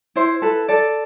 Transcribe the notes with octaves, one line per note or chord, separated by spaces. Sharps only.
E4 C5
A4 B4
A4 D5